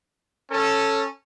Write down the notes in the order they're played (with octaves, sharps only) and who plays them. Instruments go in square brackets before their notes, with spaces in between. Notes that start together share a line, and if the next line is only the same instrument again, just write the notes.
[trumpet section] C#4 A4